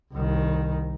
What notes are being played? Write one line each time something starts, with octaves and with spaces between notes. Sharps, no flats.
C2 D#3